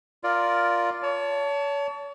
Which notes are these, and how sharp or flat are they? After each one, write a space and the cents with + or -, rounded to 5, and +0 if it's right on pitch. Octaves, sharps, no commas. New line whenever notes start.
F4 +0 A#4 +0 D5 +0
C#5 +35 A5 +0